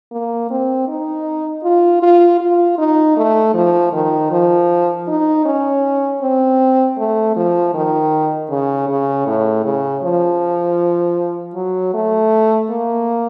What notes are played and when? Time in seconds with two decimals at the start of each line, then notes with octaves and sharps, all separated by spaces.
0.12 A#3
0.51 C4
0.88 D#4
1.64 F4
2.03 F4
2.41 F4
2.78 D#4
3.17 A3
3.55 F3
3.93 D#3
4.31 F3
5.08 D#4
5.46 C#4
6.22 C4
6.98 A3
7.36 F3
7.74 D#3
8.50 C#3
8.89 C#3
9.27 A2
9.64 C#3
10.03 F3
11.55 F#3
11.94 A3
12.70 A#3